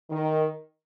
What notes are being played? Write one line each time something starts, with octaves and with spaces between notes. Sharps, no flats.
D#3